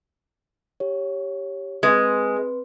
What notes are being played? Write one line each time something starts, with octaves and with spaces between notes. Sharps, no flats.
G4 C#5
G#3 C4 B4 C6